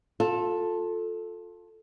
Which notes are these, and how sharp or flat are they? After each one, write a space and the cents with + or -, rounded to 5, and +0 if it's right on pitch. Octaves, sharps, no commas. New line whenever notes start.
F4 +25 A4 +0